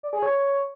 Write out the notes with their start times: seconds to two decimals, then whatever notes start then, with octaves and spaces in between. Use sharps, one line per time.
0.03 D5
0.13 G#4
0.22 C#5